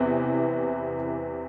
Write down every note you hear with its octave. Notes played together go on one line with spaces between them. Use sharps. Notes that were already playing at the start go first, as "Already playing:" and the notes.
Already playing: E2 C3 E3 B3